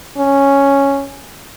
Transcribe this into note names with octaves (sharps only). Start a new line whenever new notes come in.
C#4